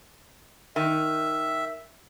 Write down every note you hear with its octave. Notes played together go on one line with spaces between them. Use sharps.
D#3 E5